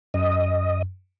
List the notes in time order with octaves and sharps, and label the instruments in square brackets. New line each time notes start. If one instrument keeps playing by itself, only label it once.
[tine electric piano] F#2 [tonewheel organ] D#5